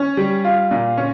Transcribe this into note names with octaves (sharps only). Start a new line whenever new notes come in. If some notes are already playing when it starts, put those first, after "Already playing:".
Already playing: C#4
G3
F4
A#2
C#4